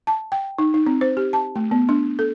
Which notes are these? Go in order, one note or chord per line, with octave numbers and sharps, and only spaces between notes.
A5
G5
D#4
D#4
C4
C5
G4
A5
A3
B3
D4
A4